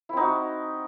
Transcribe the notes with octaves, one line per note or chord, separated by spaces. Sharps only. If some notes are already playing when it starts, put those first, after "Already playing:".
C4 D#4 E4 F#4